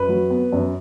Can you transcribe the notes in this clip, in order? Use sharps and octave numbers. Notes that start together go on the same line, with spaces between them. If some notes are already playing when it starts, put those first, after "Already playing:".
Already playing: F#2 B4
F#3
B3
F#2